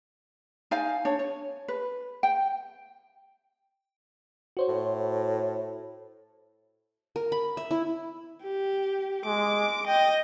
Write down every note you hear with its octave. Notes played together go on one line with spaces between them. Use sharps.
D#4 D5 F5 G#5
D4 C#5
C#5
B4
G5
F#4 C5 C#5
A2
A#4
B5
E5
E4
G4
G#3 D6
D#5 G5